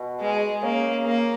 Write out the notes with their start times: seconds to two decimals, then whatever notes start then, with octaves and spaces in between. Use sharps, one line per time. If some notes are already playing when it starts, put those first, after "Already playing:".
Already playing: B2
0.20 G#3
0.63 C#3 A#3
1.06 A#3